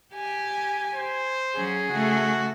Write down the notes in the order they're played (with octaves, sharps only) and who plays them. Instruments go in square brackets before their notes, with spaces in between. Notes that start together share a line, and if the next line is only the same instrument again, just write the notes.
[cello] G4 [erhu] G#5
[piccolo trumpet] C5
[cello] F#3 C#4 [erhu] G#4
[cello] C#3 A3 [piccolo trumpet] F#4